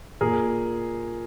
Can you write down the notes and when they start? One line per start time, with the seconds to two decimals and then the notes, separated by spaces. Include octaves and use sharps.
0.21 A#2 G#4 A#4